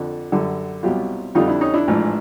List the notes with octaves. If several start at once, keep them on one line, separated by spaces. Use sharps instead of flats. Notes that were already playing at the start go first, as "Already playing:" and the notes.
Already playing: F2 D3 F3
F#2 D3 G3
C2 B2 F#3 F4 G4
F2 D3 G3 D#4 F4
D4 E4
C#4 D#4
D4 E4
A1 G#2 F3